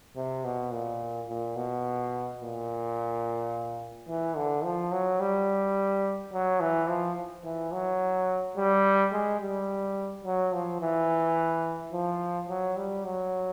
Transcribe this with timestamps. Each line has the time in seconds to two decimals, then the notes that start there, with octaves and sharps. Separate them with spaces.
0.16 C3
0.44 B2
0.72 A#2
1.28 A#2
1.56 B2
2.41 A#2
4.08 E3
4.36 D3
4.64 F3
4.92 F#3
5.20 G3
6.33 F#3
6.60 E3
6.88 F3
7.44 E3
7.72 F#3
8.56 G3
9.12 G#3
9.40 G3
10.24 F#3
10.53 F3
10.81 E3
11.93 F3
12.49 F#3
12.76 G3
13.05 F#3